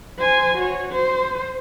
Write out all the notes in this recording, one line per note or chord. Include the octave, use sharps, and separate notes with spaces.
C5 G#5
F#4 C#5
C5